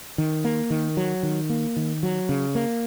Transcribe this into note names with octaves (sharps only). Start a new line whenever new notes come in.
D#3
A#3
D#3
F#3
D#3
A#3
D#3
F#3
C#3
A#3